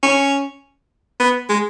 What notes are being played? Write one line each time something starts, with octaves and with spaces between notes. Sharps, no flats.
C#4
B3
G#3